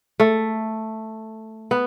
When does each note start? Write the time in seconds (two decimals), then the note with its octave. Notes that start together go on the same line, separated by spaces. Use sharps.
0.20 A3
1.71 B3